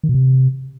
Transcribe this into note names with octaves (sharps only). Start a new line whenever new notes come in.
D#3
B2
C3